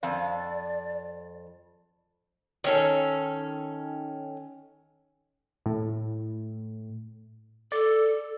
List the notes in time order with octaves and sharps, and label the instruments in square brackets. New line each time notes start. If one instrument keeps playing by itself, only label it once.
[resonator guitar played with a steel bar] F2 F5 [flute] D5
[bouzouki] D#3 C#4 A4
[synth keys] A2
[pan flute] A4 [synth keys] D5